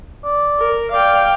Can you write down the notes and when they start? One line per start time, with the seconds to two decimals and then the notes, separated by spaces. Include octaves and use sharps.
0.24 D5
0.59 A#4
0.92 D5 F5 G5